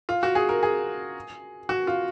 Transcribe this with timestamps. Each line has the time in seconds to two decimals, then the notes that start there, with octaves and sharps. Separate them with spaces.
0.09 F4
0.23 F#4
0.35 G#4
0.49 A#4
0.63 G#4
1.69 F#4
1.87 F4